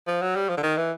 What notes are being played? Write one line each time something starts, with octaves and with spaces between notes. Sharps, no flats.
F3
F#3
G3
F3
D3
D#3
E3